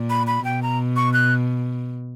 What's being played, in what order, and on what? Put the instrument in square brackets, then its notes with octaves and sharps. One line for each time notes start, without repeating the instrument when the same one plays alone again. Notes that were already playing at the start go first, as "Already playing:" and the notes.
Already playing: [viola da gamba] A#2
[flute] B5
B5
[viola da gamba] B2 [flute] G5
[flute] A#5
C#6
F#6